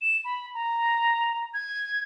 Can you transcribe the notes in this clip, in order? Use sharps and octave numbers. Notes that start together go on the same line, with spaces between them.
E7
B5
A#5
G#6